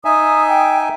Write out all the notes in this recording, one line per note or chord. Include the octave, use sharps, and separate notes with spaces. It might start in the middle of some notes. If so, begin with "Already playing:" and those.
D#4 E5 G#5 D#6
G5